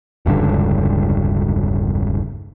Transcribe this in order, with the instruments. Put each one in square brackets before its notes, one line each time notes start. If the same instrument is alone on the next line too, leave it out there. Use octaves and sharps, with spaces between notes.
[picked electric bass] E1 C#2 G2 D3